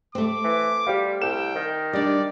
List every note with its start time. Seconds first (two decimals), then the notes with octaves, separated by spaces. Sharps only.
0.15 A3 C4 D6
0.44 E3
0.87 G3 G4 C5 F5
1.22 C2 G5 E7
1.55 D#3
1.93 G3 D4 D5